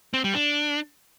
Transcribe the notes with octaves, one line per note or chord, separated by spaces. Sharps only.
C4
G3
D4